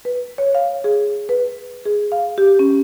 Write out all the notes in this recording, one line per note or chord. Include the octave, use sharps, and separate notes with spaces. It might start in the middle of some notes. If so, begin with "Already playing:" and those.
B4
C#5
F5
G#4
B4
G#4
F5
G4
C#4